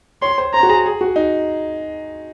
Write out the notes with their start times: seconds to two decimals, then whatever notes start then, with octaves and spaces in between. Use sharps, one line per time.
0.22 C#5 C6
0.38 C5
0.54 C5 A#5
0.63 F#4
0.69 G#4
0.86 G#4
1.01 F#4
1.16 D#4